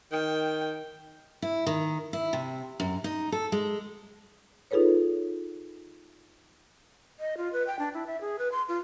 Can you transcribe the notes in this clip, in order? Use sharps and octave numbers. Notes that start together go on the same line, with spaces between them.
D#3 G5
E4
D#3
E4
C3
F#2
D#4
A4
G#3
D#4 F4 G#4 A4 B4 C#5
D#5
F4
B4
G5
D4
E4
E5
G#4
B4
C6
F4